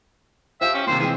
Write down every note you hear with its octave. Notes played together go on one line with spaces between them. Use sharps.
F3 F4 G4 E5 G5
C#4
C3 D#3 A#3 C5
E3 G#3 C4 G#4